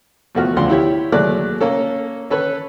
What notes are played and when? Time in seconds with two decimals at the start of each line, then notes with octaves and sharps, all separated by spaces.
0.35 E2 F3 A3 F#4 F6
0.57 D2 C#3 F3 D5 F#5 C6
0.70 E4 G4 C#5
1.12 D#2 F#3 G#3 A3 D5 F#6
1.61 A#3 C#4 A4
2.30 C#4 A4 B4 C#5